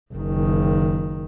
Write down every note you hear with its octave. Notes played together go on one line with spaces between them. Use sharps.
F#1 D#3